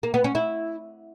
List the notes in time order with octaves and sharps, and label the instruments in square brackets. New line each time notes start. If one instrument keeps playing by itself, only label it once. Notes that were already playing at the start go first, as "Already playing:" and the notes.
[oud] A#3
B3
C#4
E4